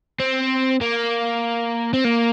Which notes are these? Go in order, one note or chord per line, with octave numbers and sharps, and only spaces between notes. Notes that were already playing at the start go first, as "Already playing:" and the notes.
C4
A#3
C4
A#3